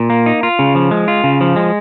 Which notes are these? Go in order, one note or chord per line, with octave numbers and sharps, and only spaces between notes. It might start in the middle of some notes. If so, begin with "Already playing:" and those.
Already playing: A#2
A#3
D#4
F4
C#3
F3
G#3
F4
C#3
F3
G#3